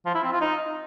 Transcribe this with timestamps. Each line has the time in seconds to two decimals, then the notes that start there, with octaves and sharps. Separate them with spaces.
0.06 F3
0.14 E4
0.23 C4
0.32 F4
0.41 D#4